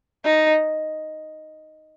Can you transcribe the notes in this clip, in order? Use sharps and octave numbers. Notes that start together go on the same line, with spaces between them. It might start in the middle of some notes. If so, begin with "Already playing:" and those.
D#4